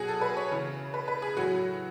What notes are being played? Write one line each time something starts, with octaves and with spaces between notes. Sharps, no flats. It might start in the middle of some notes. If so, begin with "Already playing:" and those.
Already playing: B2 F#3 F#4 G#4
A4
B4
C#5
C#3 E3
B4
B4
G#4
A2 F#3 F#4